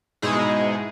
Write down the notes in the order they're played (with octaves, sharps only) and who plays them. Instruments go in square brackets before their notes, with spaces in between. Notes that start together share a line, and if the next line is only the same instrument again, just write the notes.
[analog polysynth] G#2 B2 G#3 D#4 E4 G#4